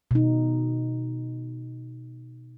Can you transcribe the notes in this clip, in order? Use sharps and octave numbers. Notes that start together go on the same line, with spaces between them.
B2 D#4